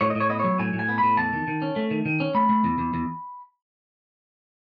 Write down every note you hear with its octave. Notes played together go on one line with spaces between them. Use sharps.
A2 C#5
D#5
A2 C#5
B3 D#5
F#3 C#5
A2 G#5
A2
G#5
B3
A2 B5
E2 A5
D#3
D#3
C#4
A3
D#3
D#3
C#4
A3 B5
A3
E2
E2
E2